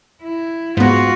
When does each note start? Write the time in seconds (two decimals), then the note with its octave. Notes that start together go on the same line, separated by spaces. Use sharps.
0.22 E4
0.77 G#2 B3 F4 F#4